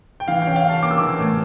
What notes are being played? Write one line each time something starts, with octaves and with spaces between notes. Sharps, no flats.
G5
E3 F5
G5
C#4
F5
C#4 A5
A#3 D6
E6
E3 D6
A2